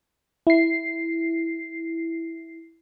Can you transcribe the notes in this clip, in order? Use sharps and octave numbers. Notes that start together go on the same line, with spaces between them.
E4 C7